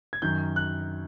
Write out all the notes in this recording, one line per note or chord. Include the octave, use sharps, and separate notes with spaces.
G#6
F#2 D#3 G6
F#6